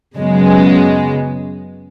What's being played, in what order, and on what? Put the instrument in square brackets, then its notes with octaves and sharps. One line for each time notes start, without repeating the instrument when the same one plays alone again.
[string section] F#2 C#3 G#3 B3